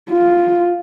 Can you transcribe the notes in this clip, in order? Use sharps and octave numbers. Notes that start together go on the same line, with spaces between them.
F4